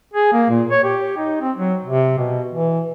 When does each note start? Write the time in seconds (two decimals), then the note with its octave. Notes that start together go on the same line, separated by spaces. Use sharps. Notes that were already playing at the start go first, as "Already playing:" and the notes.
0.13 G#4
0.32 A#3
0.50 A#2
0.71 C#5
0.84 G4
1.17 D#4
1.41 C4
1.56 F#3
1.85 C3
2.18 B2
2.52 E3